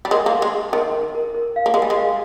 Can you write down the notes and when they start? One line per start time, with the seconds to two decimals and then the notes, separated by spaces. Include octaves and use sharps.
0.05 G3
0.11 G#3 A#4
0.26 A#3
0.32 C6
0.42 G#3
0.52 C6
0.73 D#3 A#4
0.94 A#4
1.15 A#4
1.35 A#4
1.56 F5
1.66 A#3
1.74 G#3 A#4
1.82 G3
1.90 G#3
1.96 F5